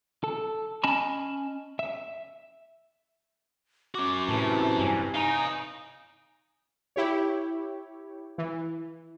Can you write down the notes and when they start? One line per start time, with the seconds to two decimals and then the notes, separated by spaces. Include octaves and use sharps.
0.24 A4
0.84 C#4 D#5 G#5 A5 B5
1.79 E5
3.95 C#4 F#4 D6
4.29 A2 C3 E3 A5
4.79 G2 G#5
5.14 D#4 F5 G#5 A#5
6.96 E4 G4 C#5
8.38 E3